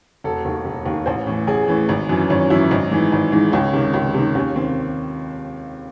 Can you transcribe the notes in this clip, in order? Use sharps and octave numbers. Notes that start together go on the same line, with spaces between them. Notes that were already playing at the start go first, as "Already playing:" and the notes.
E1 A4
D#2 D#3
E1
D#2 D#3
A1 C5
A2 E3
A1 G#4
A2 E3
G#1
F#2 E3
G#1 C#4
F#2 E3 E4
G#1 D#4
G#2 E3
G#1
G#2 E3
C#2 C#4
C3 D#3
C#2
C3 D#3
D#2 C#4
D#3 C4